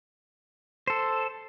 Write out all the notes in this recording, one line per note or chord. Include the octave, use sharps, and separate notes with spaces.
A4 C5